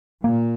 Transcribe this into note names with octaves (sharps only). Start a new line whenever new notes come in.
A#2 A#3